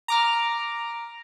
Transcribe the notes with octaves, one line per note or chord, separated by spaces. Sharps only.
A#5 D6 F6